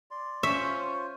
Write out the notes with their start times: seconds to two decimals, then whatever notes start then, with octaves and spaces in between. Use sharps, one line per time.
0.11 D5 C6
0.43 C#4 F4 C5 E5 C#6